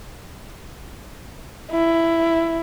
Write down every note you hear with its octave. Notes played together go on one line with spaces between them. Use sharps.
E4